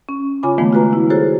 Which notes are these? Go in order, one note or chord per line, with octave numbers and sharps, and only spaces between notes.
C#4
C#3 F4 C#5 G#5 B5 D6
D#3 F3 G#3 A3 B3
F4 F#4 B4 A#5
E4
F4 F#4 G#4 A4 C5 C#5